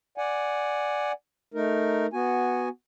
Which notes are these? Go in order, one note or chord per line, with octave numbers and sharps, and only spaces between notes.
D5 F#5 G#5
A3 D#4 A#4
B3 F#4 G#5